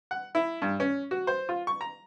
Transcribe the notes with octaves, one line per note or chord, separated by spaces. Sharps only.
F#5
E4
G2
C#4
F#4
C5
F4
C#6
A#5